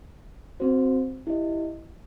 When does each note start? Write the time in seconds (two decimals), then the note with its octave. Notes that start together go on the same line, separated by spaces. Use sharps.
0.60 C4 F#4 C5
1.27 E4 G4 D#5